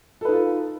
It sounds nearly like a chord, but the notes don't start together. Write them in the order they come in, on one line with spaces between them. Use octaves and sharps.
A4 B4 D#4 F4